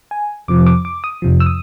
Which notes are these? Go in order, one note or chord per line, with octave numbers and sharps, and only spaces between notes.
G#5
F2 C3 F3 D6
D6
D6
D#6
F2 C3 F3
E6
D#6